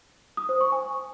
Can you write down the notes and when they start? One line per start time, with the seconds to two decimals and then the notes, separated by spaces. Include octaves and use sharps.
0.37 D#6
0.49 C5
0.61 C#6
0.72 G#5